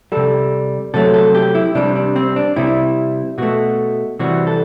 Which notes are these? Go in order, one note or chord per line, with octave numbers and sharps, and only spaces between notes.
C3 G3 A4
C3 F#3 A3 A4
A4
G4
E4
C3 G3 D4
D4
C4
D4
C3 G3 E4
B2 A3 F#4
C3 E3 G3 F#4
A4